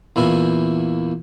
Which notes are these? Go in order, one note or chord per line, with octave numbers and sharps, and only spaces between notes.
E2 A#2 E4 G#5